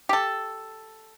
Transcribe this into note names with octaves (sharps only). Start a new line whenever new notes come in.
G4 A4